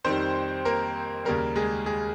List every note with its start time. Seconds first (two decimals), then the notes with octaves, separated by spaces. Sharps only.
0.04 F2 D#3 G3 C4 C5
0.65 A#3 A#4
1.25 D#2 C#3 G3 A#3 A#4
1.56 G#3 G#4
1.86 G#3 G#4